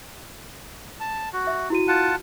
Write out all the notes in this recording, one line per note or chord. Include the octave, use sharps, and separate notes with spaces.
A5
F#4
E5
E4 F#4 D#7
F4 F#5 A5